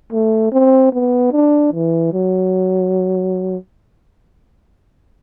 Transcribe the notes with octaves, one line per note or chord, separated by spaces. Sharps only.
A3
C4
B3
D4
E3
F#3